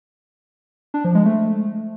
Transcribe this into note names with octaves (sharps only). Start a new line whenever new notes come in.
D4
F3
G#3
A3